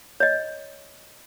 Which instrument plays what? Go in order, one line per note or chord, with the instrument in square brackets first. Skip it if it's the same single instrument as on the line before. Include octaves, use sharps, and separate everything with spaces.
[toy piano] C#5 D#5